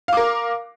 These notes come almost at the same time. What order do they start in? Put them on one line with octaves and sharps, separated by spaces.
F5 D6 A#4